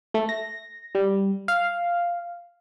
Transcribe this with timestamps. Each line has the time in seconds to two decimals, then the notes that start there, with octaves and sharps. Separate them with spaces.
0.14 A3
0.29 A#6
0.95 G3
1.48 F5